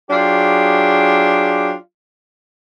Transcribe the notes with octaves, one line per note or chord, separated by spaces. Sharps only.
F#3 D4 F4 G4 G#4